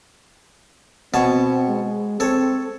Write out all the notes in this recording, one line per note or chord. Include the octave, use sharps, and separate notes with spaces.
B2 C4 C#5 A5
G#3
C4 A4 C#5